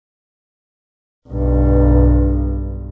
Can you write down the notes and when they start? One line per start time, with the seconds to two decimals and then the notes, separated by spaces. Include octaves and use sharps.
1.29 B1 G2